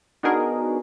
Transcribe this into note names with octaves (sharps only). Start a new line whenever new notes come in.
B3 D4 D#4 F#4 G#4 A#4